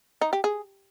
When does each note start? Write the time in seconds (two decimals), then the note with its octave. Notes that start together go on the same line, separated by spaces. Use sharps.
0.21 D#4
0.33 G4
0.44 G#4